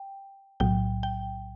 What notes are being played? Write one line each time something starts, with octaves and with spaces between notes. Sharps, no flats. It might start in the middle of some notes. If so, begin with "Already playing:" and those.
Already playing: G5
B1 A2 F#3 G5
G5